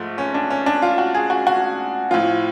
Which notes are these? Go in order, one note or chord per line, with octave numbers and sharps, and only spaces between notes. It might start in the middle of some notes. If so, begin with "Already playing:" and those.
Already playing: G#2 F3 A3
C#4
D4
C#4
D4
F4
F#4
G#4
F#4
F#4
A2 F3 F4